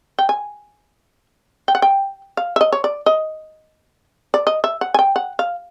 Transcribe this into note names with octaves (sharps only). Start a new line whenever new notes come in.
G5
G#5
G5
F#5
G5
F5
E5
D#5
C#5
D5
D#5
D5
D#5
E5
F#5
G#5
G5
F#5
F5